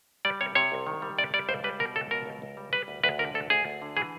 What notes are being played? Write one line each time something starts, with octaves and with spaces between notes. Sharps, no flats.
G3 D5
C3 C#5
C3 C#5
C2
D#3
G3
C3 D5
G3 D5
C#2 C5
G3 B4
B2 A#4
C#2 A4
B2 A#4
C#2
C#2
G3
G3 B4
D2
D2 B4
D3 A#4
D2 A4
D2 G#4
D2
D3
E3 G#4